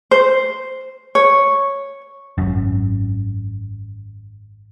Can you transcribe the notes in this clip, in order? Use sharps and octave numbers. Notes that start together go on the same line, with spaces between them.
C5
C#5
G#1 F#2